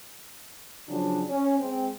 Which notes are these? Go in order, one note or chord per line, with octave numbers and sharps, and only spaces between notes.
C#3 F3 F#3 D4
C#4
G#3 C4